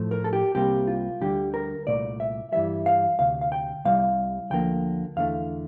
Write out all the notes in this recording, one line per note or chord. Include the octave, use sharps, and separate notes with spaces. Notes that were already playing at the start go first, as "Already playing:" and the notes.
Already playing: A2 F3 A3
A#4
A4
G4
C2 C3 G3 A#3 G4
F4
D2 D3 G3 G4
A#4
C2 A#2 A3 D5
E5
G2 E3 G3 E5
F5
D2 C3 F5
F5
G5
C2 C3 G3 F5
D2 D3 F3 A#3 G5
E2 D3 A3 F5